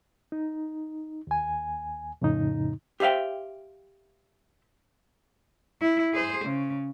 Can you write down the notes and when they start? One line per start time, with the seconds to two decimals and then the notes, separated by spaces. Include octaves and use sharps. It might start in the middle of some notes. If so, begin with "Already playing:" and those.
0.32 D#4
1.27 D#2 G#5
2.22 F2 A2 C#3 D#4
3.00 G4 C5 E5 F5 G5
5.81 E4
6.14 G#4 C5
6.45 C#3